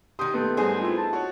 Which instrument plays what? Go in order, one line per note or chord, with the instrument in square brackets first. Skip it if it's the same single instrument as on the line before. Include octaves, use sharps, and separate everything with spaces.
[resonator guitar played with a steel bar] D#3 G4 [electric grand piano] C6 G6 [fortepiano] D#6
[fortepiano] A3 B3
[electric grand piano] G#2 G3 [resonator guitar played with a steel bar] D#4 G#4 C5
[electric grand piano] C4 E4 [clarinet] F4
[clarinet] A5
[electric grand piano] F#4 C#5